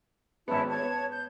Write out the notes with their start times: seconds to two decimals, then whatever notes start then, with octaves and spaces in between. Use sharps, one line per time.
0.48 G#1 B3 C#4 E4 A5
0.69 C#5 A5 G#6
0.82 B3
1.11 G6